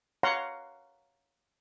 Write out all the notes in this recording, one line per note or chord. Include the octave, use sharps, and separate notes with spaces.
C#5 F5 F#5 A#5 C6